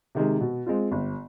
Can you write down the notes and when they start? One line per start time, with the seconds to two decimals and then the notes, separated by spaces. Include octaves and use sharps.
0.15 C3 D#3 G#3
0.40 B2
0.66 G#3 C4 F4
0.91 G1